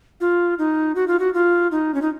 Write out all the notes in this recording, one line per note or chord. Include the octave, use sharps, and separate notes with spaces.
F4
D#4
F#4
F4
F#4
F4
D#4
C#4
D#4